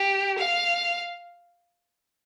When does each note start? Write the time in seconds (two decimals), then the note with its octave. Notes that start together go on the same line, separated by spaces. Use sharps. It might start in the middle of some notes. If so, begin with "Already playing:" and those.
Already playing: G4
0.38 F5